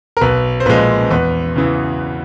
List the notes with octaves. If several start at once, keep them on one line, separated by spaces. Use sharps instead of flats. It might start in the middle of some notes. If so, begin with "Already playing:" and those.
A#4
B1 B4
C5
A#2 F3 G#3 B4
E2 B4
C#3 E3